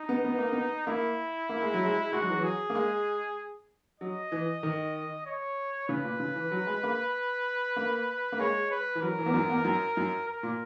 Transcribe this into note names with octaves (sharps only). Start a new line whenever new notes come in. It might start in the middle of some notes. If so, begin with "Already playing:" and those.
Already playing: D#4
B3
B3
A#3
B3
A#3 E4
A#3
G#3
F#3
G#3
G#3 F#4
F#3
E3
F#3
G#4
A#3
G#3
F#3 D#5
E3
D#3
C#5
C#3 B4
A#2
C#3
E3
F#3
G#3
A#3
A#3
A#3
G#3 C#5
B4
E3
F#3 A#4
E3
E2
F#2
E2
F#2
F#2
A#4
A#2